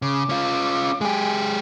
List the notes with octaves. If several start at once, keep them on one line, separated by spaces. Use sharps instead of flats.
C#3 D6
C#4 F4
G#3 G4 G#5